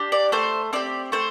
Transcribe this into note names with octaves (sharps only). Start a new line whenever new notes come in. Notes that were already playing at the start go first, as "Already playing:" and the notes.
Already playing: D4 G4
D5
A3 C5
C4 G4 D5
A3 C5